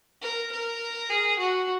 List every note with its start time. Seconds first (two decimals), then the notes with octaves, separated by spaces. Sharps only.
0.22 A#4
0.52 A#4
1.10 G#4
1.39 F#4